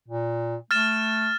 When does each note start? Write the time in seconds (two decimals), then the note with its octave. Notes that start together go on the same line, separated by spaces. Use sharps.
0.08 A#2
0.71 A3 F6 A6 E7